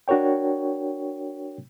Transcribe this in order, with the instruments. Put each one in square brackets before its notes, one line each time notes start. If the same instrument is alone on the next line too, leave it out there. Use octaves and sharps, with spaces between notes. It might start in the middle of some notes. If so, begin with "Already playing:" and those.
[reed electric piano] D4 F#4 A#4 C#5 G5